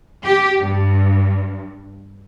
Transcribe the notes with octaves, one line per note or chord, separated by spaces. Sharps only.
G4
G2